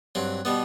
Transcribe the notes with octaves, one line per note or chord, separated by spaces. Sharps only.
G2 F#3 C4
B2 G3 B3